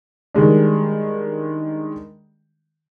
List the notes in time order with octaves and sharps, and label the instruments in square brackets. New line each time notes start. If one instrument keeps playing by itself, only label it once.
[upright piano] D#3 G3 G#3 D4